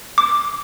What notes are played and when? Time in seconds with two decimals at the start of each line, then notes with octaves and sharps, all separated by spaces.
0.18 D6